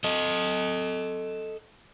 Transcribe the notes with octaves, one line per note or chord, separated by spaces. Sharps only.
A4 D#5